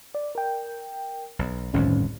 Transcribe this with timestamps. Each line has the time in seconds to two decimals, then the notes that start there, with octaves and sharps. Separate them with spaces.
0.15 D5
0.35 A#4 G5
1.39 B1
1.74 G1 C2 F2 A2 D#3 C#4